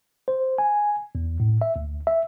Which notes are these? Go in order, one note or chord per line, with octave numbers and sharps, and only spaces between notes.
C5
G#5
E2
A2
E5
D2
E5